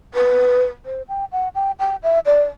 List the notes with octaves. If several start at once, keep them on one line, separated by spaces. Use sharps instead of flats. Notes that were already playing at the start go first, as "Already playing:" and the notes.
B4
C5
G5
F#5
G5
G5
E5
D5